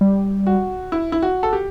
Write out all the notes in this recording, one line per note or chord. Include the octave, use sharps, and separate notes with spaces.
G3
F#4
E4
E4
F#4
A4
G4